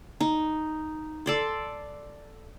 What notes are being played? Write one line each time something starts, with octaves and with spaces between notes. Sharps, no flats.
D#4
A4 D5 C6